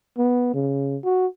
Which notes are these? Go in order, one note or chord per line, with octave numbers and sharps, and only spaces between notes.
B3
C#3
F#4